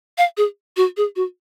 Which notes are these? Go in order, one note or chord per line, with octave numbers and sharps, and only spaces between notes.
F5
G#4
F#4
G#4
F#4